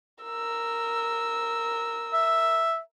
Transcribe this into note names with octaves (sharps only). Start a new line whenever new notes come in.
A#4 E6
E5